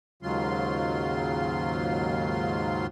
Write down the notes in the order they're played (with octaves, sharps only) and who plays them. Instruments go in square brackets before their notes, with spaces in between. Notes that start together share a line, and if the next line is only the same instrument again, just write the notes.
[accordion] D#2 G#2 C#3 F#3 F4 C6